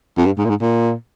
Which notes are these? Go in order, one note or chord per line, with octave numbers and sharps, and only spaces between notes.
F2
G2
G#2
A#2
G#2
A#2